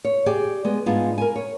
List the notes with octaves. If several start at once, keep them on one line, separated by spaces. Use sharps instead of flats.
C#5
G4 G#4 D5 G5
G#3 B3
G#2 G#3 B3 D4 D#4 F4
A#4 G#5
C#5